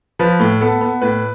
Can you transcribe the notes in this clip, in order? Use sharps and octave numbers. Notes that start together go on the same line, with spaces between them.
F3 B4
A2
B3 A4
B3
A2 B4